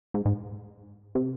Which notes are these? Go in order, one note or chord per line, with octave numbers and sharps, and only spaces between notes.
G#2
G#2
C3